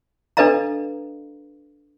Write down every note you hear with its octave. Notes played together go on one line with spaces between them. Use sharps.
D4 A4 B4 D#5 F5 A#5